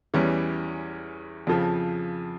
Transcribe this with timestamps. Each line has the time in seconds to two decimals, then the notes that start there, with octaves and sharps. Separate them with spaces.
0.14 E2 E3 G3 C#4
1.47 F2 C#3 F3